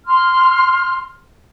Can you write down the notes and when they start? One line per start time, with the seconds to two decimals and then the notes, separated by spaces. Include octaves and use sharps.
0.06 C6 F6